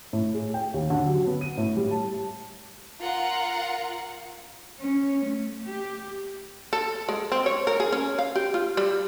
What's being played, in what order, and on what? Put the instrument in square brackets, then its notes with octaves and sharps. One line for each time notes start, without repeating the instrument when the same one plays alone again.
[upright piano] A2
G#4
G5
D#2
D3
F#3
B3
D#7
A2
G3
A5
[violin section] F4 A#4 F5 F#5
[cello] C#4
A3
G4
[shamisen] A4
G#3
C4
C#5
A#4
G#4
C#4
F5
G4
F4
G3